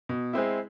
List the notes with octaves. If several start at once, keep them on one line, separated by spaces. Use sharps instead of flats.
B2
G#3 C4 E4